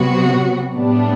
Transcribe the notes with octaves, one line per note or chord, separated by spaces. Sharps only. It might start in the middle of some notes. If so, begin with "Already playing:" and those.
Already playing: C3 F#3 B3 F#4
A2 G3 B3 D4